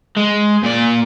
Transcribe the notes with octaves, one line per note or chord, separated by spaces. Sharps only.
G#3
A#2 D5